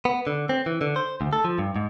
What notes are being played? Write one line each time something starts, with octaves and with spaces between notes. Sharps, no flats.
B3
D3
C4
E3
D3
C5
D2
A4
F3
G2
G#2